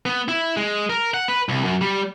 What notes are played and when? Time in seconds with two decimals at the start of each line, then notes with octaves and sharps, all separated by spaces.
0.06 B3
0.28 E4
0.57 G#3
0.90 A#4
1.14 F#5
1.28 B4
1.49 C2
1.64 F#2
1.81 G3